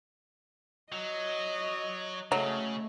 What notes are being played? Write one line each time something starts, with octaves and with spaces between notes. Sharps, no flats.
F#3 D#5
C#3 F#3 A3 D#5